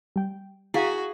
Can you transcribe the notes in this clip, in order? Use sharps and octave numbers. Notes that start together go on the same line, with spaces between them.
G3 G5
E4 F#4 G#4 F5